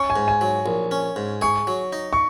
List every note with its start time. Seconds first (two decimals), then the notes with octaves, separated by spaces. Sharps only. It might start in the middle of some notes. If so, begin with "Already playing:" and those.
Already playing: C#4 C#6
0.10 G#5
0.16 G#2
0.28 G#5
0.41 F#3
0.66 A#1
0.91 C#4
1.16 G#2
1.41 G#4 C#6
1.67 F#3
1.93 D#4
2.13 C#6